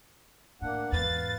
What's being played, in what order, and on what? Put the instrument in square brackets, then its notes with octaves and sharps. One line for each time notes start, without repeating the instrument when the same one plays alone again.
[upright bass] A2 [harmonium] A#3 D4 F#5
[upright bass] E2 G#2 [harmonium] B4 F5 [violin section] A6